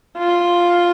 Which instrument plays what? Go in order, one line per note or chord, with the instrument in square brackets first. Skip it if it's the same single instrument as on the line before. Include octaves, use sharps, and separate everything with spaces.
[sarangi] F4